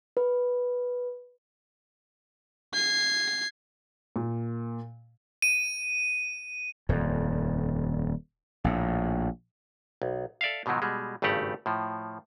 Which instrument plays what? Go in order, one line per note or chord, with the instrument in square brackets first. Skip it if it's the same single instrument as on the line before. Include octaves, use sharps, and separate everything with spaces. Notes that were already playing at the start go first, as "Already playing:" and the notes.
[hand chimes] B4
[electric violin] G#6 C7
[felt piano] A#2
[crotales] D#7
[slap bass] D#1 F2
A#1 A2
[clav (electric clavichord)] B1
A4 D5 E5 F5
G#2 B2 D#3 F3 F#3
B2 G3 G#3
G#1 G2 C#3 A3 G4 F#5
A2 F3